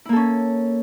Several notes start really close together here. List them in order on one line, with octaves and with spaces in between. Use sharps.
E4 A#3 A4 C#4